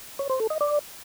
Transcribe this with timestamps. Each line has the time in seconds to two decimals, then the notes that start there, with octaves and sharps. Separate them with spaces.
0.19 C#5
0.30 C5
0.40 A4
0.50 D#5
0.61 D5